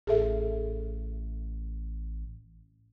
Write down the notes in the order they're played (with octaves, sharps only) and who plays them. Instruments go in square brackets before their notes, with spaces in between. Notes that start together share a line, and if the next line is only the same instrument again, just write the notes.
[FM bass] A1 [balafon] G#4 A4 E5